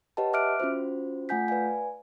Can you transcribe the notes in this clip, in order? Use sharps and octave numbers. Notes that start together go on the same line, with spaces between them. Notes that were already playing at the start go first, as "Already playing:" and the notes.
G4 B4 C#5 D#5 F#5 A5
E5 D6 F6 F#6 D7
C#4 F4 F#4 C5
A3 F4 F#5 G#5 G6 B6
B4 D5 F5 G#5